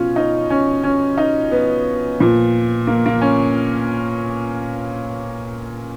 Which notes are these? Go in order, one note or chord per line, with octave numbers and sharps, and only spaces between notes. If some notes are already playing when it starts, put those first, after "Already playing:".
Already playing: B2 C#4 F4
D#4
C#4
C#4
D#4
B3
A#2 F3
A#3
A#3
C#4